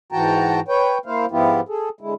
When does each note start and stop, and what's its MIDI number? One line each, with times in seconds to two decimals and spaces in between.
0.12 0.60 44
0.12 0.60 52
0.12 0.60 66
0.12 0.60 79
0.12 0.60 81
0.12 0.60 82
0.68 0.98 71
0.68 0.98 73
0.68 0.98 79
1.06 1.26 58
1.06 1.26 64
1.06 1.26 72
1.06 1.26 77
1.31 1.61 44
1.31 1.61 53
1.31 1.61 59
1.31 1.61 64
1.31 1.61 65
1.31 1.61 67
1.69 1.89 68
1.69 1.89 69
2.01 2.14 50
2.01 2.14 56
2.01 2.14 64